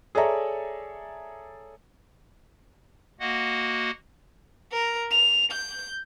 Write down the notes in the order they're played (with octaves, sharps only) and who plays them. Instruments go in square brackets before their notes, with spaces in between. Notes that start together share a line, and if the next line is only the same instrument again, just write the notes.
[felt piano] G#4 A4 C#5 D5 E5 A#5
[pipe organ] A#3 F#4 D#5 F#5
[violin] A#4
F7
G6